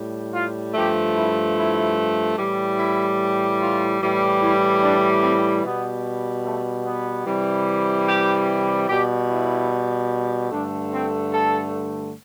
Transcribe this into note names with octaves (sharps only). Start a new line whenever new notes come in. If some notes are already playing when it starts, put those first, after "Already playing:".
Already playing: A2 G3
F4
G2 F3 A3 G4
E4
E4
A2 E3 G3
E4
F4
A2 E3 G3
E4
D4
C4
B2 G3 B3
A3
B3
C3 E3 G3
G4
B2 G3 G4
E4
G2 D3 A3 D4
C4
A4